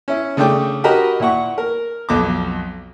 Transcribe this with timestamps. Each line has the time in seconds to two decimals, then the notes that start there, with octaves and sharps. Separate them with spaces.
0.08 C#4 E4
0.37 C#3 A3 D4 G5 D6
0.84 F#4 G4 A#4 D#5 A#5 B5
1.20 A#2 E4 F#5 C#6
1.58 A#4
2.09 B1 F2 D6